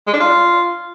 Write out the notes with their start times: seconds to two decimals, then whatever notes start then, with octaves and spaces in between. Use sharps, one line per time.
0.07 G#3
0.13 D4
0.20 F4